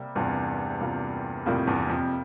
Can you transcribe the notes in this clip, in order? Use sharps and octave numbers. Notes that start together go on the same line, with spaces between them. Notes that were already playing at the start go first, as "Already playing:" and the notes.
Already playing: C3 G3 A#3
E2 G2 C3 G3 A#3 F4 A#4
C3 G3 A#3 F4 A#4
F2 A2 C3 G3 A#3 F4 A#4
E2 G2
F2